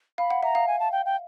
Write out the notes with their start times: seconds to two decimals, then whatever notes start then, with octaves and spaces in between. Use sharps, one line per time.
0.18 F5 B5
0.30 F#5
0.43 E5 A#5
0.55 F5
0.67 G#5
0.80 A5
0.92 G5
1.06 G5